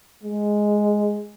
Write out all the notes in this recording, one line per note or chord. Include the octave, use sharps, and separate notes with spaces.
G#3